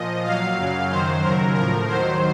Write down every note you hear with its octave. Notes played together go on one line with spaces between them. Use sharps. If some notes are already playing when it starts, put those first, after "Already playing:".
Already playing: A#2 F3 D#5
A#2 F#3 F5
F#2 C#3 F#3
F#2 D#3 F#3 C5
D#2 C#3 F#3 A#4
A2 F3 A#4
D#2 D#3 F#3 C5